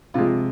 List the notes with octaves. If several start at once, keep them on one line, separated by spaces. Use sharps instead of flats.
C3 F3 G#3 F4